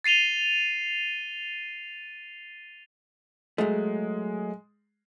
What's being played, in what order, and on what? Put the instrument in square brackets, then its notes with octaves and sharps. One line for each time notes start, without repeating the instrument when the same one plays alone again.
[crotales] A6 C7 D#7 F7 G7
[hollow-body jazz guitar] F#3 A3 [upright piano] G#3